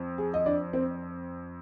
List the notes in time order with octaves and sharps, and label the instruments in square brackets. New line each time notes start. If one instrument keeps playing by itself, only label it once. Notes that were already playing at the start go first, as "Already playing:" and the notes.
Already playing: [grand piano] F2
[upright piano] G#4
D#5
D4 D5
C4 C5